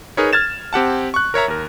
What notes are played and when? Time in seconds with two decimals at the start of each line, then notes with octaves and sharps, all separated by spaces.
0.17 D#4 G#4 A#4 B4 C#5
0.33 F6 G#6 A6 E7
0.73 C4 G4 F#5 A5
1.14 C#6 F#6
1.34 A#4 C#5 E5 A#5
1.48 D#2 A#4